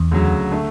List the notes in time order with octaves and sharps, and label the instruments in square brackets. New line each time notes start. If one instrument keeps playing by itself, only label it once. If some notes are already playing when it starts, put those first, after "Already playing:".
Already playing: [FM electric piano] E2
[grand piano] D2 C#3 F#3
D3 A3